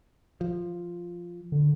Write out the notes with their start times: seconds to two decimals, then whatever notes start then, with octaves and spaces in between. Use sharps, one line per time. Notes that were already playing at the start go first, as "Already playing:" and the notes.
0.41 F3
1.52 D3